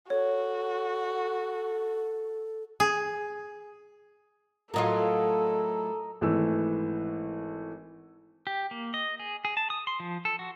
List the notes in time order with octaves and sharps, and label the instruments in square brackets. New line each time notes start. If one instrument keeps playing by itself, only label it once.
[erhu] F#4 [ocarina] A4 [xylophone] C#5
[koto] G#4
[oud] A2 F#3 F4 [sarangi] A4 [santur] A#4 D#5
[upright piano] G#1 E3 A3 E6
[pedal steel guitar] G4
A#3
D#5
G#4
G#4
A5
D#6
C6
F3
A4
F#4